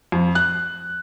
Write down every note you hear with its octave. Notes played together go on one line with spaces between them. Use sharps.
F2
F#6